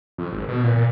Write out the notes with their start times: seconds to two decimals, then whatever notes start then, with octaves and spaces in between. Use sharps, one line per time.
0.18 F2
0.32 G#1
0.48 B2
0.63 A#2
0.76 A#2